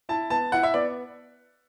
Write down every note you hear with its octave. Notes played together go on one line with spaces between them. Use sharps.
E4 A5
B3 A5
E4 F#5
E5
B3 D5